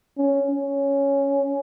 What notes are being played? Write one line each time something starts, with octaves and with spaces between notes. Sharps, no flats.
C#4
C#4